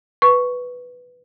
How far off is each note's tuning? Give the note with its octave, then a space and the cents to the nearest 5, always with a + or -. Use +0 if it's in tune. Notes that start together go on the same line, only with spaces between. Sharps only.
B4 +0 C#6 +5